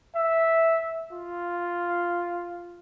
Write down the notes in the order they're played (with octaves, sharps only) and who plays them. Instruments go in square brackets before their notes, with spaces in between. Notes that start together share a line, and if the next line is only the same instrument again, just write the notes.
[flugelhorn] E5
F4